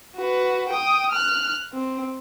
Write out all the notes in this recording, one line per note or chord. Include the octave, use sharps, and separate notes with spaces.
F#4 B4
G5 D#6
F6 F#6
C4